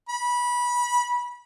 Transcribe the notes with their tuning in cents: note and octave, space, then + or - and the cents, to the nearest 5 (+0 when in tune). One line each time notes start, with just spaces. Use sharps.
B5 -20